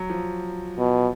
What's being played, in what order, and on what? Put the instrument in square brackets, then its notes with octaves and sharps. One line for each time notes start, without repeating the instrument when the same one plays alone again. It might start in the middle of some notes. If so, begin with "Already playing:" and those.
Already playing: [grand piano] F#3
F3
[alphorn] B2